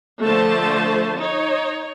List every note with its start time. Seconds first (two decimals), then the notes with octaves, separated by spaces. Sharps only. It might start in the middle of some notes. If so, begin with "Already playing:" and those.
0.23 D3 F3 A3 C5 A5
1.20 D#4 C#5